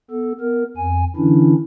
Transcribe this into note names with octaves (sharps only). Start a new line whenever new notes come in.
B3 A4
B3 A#4
F2 G#5
D3 E3 C#4 D4 E4